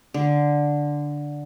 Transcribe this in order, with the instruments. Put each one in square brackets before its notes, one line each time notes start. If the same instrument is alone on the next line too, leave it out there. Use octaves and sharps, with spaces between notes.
[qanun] D3